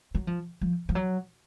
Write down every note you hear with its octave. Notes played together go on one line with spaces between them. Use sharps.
F#3
F3
F3
F3
F#3